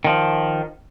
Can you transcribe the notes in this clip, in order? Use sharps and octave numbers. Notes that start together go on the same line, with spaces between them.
D#3 F3